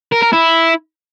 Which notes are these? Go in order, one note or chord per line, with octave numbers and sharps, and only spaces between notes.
A#4
A#4
E4